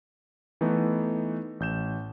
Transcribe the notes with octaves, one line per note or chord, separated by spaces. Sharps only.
E3 A3 B3 D#4
A1 G6 E7